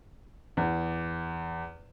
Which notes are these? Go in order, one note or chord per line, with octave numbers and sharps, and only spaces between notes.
E2